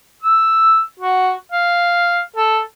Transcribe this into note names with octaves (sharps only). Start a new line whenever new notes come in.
E6
F#4
F5
A4